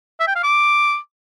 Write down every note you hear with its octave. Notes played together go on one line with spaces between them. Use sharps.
E5
G5
F5
D6